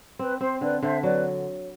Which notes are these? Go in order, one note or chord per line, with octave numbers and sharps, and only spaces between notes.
C4 B4
C4 C5
D3 B4 D5
D3 C5 E5
F#3 B4 D5